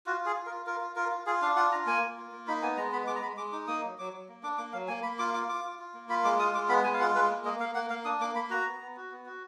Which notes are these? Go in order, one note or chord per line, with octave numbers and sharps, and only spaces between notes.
F4 F#4
F4 G#4
F4
A#4
F4
F4 A#4
F4
F4 A#4
F4
F4 G#4
D4 F5
F4 F#5
F4 A#5
A#3 G#5
A#3
F4
A#3
D#4 B5
B3 G#5
G#3 A#5
B3 B5
G#3 D6
A#5
G#3 B5
G#3 D6
D#4 D6
A#3 D#6
F#3
F#3 D6
F#3
A#3
D4 D6
A#3 D6
F#3 F5
A#3 G#5
A#3 B5
F4 D6
F4 D6
F4 D6
F4
F4
A#3
F4 B5
G#3 D6
F4 D#6
G#3 D6
B3 B5
G#3 G#5
F5
F4 F#5
G#3 B4
A#3
A#3 D#5
A#3 F5
A#3 F#5
A#3 F5
D4 D#6
A#3 D6
A#3 B5
F#4 A#5
B3
B3
F#4
B3
F#4